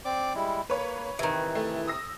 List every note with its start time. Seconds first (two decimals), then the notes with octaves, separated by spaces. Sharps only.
0.05 C4 D5 D6
0.35 G3 G#3 E4
0.70 A#3 B4 C#5
1.19 C3 D#3 E3
1.55 A3
1.87 D#6 E6 A#6